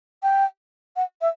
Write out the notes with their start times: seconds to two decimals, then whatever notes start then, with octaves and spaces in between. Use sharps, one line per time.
0.23 G5
0.96 F#5
1.21 E5